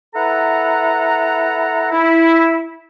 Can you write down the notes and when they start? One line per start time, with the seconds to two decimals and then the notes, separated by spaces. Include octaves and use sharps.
0.14 E4 A4 B4 F#5 A#5
1.91 E4